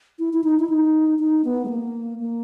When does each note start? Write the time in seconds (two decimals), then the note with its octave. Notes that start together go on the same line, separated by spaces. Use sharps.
0.19 E4
0.33 E4
0.44 D#4
0.59 E4
0.70 D#4
1.19 D#4
1.45 B3
1.65 G#3
1.69 A#3
2.20 A#3